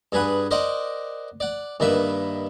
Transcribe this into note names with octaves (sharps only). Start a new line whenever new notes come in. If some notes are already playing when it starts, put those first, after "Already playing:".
G2 G#4 B4 F#5
A#4 C5 D5 D#5 F#5
D5 F#5
G2 D#3 A#3 B4 E5